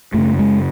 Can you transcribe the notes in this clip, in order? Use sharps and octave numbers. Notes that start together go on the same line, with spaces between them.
F#2 C#3 A3
G#3